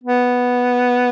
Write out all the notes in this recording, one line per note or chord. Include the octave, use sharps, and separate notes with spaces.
B3